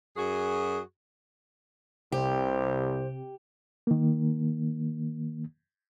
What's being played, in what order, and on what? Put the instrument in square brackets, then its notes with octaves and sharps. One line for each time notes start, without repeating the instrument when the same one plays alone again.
[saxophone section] F#2 F#4 G#4
[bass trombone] C2 [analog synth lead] C3 [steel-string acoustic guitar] G4 [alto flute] C5
[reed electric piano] D#3 A#3